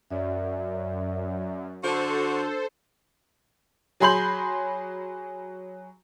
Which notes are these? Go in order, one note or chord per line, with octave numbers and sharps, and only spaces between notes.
F#2 D5 E5
D3 D4 F#4 A4 C5
F#3 G#4 B5 C6 G6 F#7